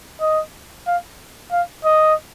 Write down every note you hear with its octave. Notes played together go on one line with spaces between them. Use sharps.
D#5
F5
F5
D#5